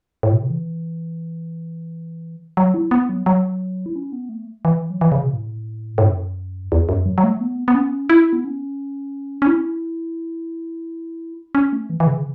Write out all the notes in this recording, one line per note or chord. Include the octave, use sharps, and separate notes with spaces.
A2
B2
C#3
E3
F#3
E4
B3
F#3
F#3
E4
C#4
B3
A3
E3
F#3
E3
C#3
B2
A2
A2
F#2
E2
F#2
F#3
F#3
A3
B3
B3
C#4
E4
B3
C#4
C#4
E4
C#4
A3
E3
E3
C#3